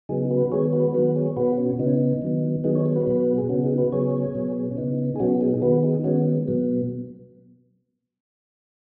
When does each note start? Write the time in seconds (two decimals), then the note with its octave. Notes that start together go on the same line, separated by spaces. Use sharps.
0.09 C#3 F#3 B3 D#4 G#4
0.30 F#4 B4
0.52 D#3 G#3 B3 G#4 C#5
0.73 F#4 B4
0.94 D#3 F#3 B3 F#4 B4
1.15 G#4 C#5
1.36 B2 B3 F#4 B4
1.58 C#4 F#4
1.79 C#3 B3 D#4
1.87 C#4
1.94 D#4
2.22 D#3 F#3 B3
2.64 D#3 F#3 B3 D#4 G#4
2.75 G#4 C#5
2.86 G#4 C#5
2.96 F#4 B4
3.07 B2 F#3 B3
3.38 G#4
3.49 C#3 B3 C#4 F#4
3.64 D#4 G#4
3.78 F#4 B4
3.92 C#3 F#3 B3 G#4 C#5
4.35 B2 F#3 B3
4.71 C#4
4.77 C#3 B3 D#4
4.99 D#4
5.16 G#4
5.20 B2 F#3 B3 C#4 F#4
5.41 D#4 G#4
5.54 G#4
5.62 D#3 B3 F#4 B4
5.83 D#4 G#4
6.04 D#3 G#3 B3 C#4 F#4
6.48 B2 F#3 B3